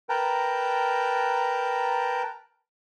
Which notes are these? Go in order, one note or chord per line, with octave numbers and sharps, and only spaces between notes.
A#4 B4 G5 A5 A#5